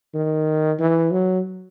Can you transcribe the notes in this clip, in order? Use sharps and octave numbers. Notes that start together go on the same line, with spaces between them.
D#3
E3
F#3